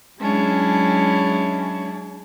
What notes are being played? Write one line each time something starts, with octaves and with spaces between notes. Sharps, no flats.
F#3 G#3 C#4 D4 E4